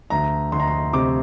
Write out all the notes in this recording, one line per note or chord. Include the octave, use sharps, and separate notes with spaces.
D2 A#5
D2 C6
A#5
C6
C3 D6